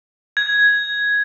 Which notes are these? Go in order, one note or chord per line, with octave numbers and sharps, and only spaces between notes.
G#6